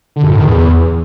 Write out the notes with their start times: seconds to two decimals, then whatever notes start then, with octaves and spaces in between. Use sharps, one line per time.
0.16 D3
0.23 F#2
0.31 A2
0.38 D#3
0.45 E2